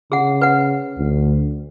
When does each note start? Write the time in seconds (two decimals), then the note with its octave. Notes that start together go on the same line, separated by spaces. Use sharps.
0.12 C#3 G#4 F#5
0.41 B4 F#5
0.98 D2